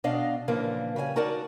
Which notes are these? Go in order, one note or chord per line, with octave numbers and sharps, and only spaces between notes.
B2 D4 D#5 F5
A#2 C#3 E3 F3 A#3 D4
C#3 G3 E5 G#5
D#4 F#4 A#4 D5 A5